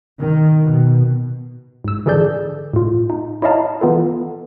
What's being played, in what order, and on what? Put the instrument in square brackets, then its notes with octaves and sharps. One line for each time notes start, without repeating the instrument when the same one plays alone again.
[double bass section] D#3
B2
[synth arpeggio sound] G#2 E6
D3 E3 G#4 A4 D5 G6
A2 F4
D#4
E4 C#5 D#5 F5 A5 A#5
E3 B3 F4 A4